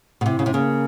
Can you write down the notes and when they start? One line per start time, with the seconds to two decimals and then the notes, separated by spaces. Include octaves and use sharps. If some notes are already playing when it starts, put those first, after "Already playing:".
0.21 B2
0.25 C3 E4
0.39 C#3
0.46 C3
0.53 C#3 A#3